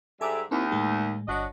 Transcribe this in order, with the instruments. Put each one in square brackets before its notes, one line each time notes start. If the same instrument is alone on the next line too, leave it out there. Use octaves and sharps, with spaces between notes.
[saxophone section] G#2 G3 E5 [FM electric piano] A4 G#5 D6
[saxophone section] D#2 D#3 [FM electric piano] C4 D#4 E4
[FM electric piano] A2 G#3
[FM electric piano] G1 C#5 [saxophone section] D4 F#4 D#5